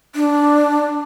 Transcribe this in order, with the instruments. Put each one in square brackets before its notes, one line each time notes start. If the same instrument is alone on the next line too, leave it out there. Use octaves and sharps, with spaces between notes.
[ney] D4